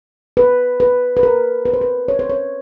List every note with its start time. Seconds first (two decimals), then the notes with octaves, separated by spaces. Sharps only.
0.37 B4
0.80 B4
1.17 B4
1.23 A#4
1.65 B4
1.73 C5
1.81 B4
2.08 C#5
2.19 C5
2.30 C#5